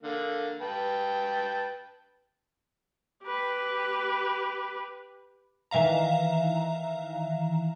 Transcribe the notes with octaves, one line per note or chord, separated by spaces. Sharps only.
D3 A#3
B4 G5 A5
G4 B4
D#3 E3 E5 F5 A#5